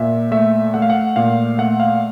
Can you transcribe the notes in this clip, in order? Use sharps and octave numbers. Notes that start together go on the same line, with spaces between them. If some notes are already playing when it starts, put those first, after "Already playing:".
Already playing: A#2 E5
A3 E5
A3 F#5
F5
F#5
A#2 F5
A3 F#5
F5